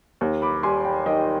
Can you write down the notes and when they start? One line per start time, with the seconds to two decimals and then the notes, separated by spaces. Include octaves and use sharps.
0.21 D#2
0.42 B5 D6
0.63 G3 G#5 C6
0.85 G5 B5
1.06 D#3 D#5 G5